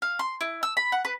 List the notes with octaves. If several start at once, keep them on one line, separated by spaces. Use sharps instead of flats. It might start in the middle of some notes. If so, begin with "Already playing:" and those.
F5
C6
E4
E6
B5
F#5
B4